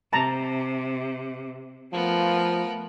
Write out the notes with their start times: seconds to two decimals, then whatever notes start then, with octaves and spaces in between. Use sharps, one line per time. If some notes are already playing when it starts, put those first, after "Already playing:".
0.13 C3 A5 A#5
1.93 F3 A3 B3 A#4